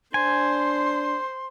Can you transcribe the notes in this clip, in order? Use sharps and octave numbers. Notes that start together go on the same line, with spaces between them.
D4 C5 G#5 C6